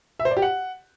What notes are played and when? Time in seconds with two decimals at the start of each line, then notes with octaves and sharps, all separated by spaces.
0.20 E5
0.25 C5
0.31 D5
0.37 G4
0.42 F#5